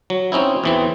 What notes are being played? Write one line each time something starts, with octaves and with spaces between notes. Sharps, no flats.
F#3
C4 C#4 D#4 E4
E2 E3 C4